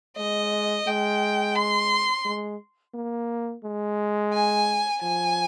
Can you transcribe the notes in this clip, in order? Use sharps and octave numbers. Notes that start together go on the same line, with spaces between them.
G#3 D#5
G#3 G5
C6
G#3
A#3
G#3
G#5
F3 G#5